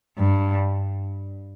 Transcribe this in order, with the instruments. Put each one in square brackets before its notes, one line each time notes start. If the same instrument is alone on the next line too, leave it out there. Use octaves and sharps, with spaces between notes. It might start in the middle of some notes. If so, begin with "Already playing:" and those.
[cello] G2